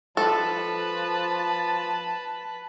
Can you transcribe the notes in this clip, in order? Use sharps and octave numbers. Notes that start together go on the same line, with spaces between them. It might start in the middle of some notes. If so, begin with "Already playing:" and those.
F3 A4 B4 A5